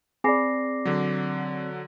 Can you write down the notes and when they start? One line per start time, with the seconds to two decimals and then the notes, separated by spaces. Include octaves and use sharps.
0.24 C4 G#4 D5 G#5 B5 D6 A#6 C7
0.85 D3 F#3